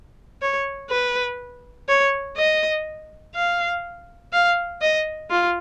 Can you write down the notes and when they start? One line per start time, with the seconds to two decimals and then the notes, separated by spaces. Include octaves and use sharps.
0.42 C#5
0.90 B4
1.89 C#5
2.37 D#5
3.35 F5
4.33 F5
4.81 D#5
5.30 F4